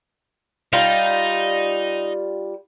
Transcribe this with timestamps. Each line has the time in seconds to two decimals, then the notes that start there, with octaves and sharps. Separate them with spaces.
0.73 G3 D#4 F4